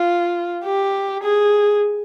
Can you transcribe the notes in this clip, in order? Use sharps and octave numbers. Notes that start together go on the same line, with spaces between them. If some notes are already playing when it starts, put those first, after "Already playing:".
Already playing: F4
G4
G#4